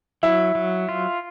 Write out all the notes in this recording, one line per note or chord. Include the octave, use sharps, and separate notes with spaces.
F#3 E4
F#3
F4